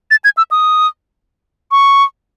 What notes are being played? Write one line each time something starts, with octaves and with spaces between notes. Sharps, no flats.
A6
G#6
E6
D#6
C#6